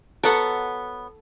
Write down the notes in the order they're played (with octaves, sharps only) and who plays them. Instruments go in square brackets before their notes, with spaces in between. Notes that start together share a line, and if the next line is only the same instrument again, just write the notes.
[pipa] F#3 B3 [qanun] A4 F#5